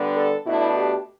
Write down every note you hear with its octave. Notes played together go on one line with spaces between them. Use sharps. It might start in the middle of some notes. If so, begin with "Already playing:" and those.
Already playing: D3 G3 B3 D4
A4
B2 A3 D4 E4
G4